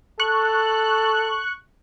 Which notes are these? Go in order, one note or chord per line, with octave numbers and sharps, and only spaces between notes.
A4 C#6 F#6